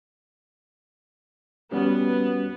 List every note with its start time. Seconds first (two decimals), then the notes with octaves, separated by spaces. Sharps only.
1.71 G3 B3 C#4 F#4